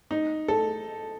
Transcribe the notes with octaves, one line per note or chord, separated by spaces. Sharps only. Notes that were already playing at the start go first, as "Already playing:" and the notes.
D#4
A4